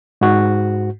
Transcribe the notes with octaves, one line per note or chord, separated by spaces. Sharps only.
G#2 F#4